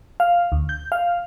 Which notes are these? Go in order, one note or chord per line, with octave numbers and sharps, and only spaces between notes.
F5
D2
G6
F5